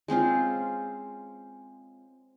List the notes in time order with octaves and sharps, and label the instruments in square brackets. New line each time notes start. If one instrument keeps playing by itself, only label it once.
[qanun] G#3 C4 C#4 F4